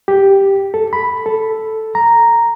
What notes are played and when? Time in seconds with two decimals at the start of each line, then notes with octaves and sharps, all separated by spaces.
0.08 G4
0.74 A4
0.93 B5
1.26 A4
1.95 A#5